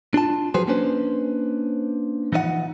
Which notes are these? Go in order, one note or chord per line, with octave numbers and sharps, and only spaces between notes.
D4 F4 A5
F3 F#3 F#4 G#4 B4 C5
A#3 C#4 D4 B4 C5
E3 F3 D#4 D#5 F#5